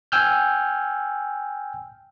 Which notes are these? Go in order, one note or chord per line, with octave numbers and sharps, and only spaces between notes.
G5 G#5 E6 F6 G6